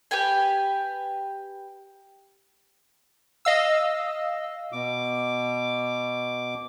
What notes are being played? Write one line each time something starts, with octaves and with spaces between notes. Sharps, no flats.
G4 B4 G5 G#5
D#5 F5 E6
B2 D6